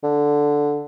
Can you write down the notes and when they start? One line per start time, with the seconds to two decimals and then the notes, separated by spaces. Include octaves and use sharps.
0.03 D3